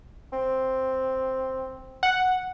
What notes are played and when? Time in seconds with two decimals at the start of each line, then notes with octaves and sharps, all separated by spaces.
0.33 C4
2.03 F#5